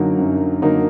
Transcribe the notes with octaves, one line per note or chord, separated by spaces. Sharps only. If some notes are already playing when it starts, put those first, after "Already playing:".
Already playing: F#2 D3 F#3 A#3 D#4
F#2
D3 F#3 A#3 D#4